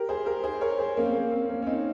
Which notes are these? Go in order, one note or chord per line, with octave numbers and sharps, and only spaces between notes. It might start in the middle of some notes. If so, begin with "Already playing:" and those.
Already playing: G4 A#4
G#4 C5
G4 A#4
G#4 C5
A#4 C#5
G#4 C5
A#3 C#4
C4
A#3
C4
A#3 C#4
C#4
C4 D#4